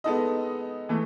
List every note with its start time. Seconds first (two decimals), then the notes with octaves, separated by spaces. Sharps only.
0.04 G#3 B3 D#4 A4 D#5
0.89 E3 A3